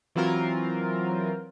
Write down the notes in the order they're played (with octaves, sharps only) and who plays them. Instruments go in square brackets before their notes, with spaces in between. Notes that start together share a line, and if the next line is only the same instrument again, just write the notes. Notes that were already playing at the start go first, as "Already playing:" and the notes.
[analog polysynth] E3 F#3 C4 F4 A#4